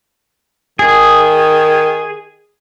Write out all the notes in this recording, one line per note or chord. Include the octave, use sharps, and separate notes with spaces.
D#3 G#4